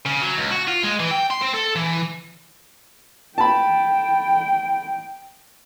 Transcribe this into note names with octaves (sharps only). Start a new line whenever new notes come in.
C#3
F#3
C#2
F#4
F4
G#3
E3
G5
C6
C4
A4
E3
G5 A5 B5